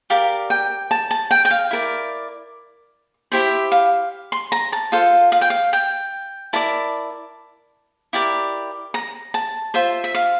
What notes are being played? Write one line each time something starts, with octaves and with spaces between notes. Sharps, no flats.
G4 A#4 D5 F5
G5
A5
A5
G5
G5
F5
E4 A#4 D5
E4 G4 C5 E5
F5
C6
A#5
A5
F4 A4 C5 F5
F5
G5
F5
G5
E4 A#4 D5 A5
E4 G4 A#4 D5
A#5
A5
F4 C5 E5
E5
F5